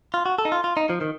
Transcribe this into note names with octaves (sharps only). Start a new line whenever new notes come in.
F4
F#4
A4
D#4
F4
F4
D#4
F3
D#3